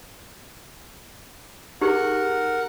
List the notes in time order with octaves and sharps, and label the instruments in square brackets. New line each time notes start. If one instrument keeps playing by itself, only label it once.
[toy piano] D#4 G4 G#4 [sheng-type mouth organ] A#4 F#5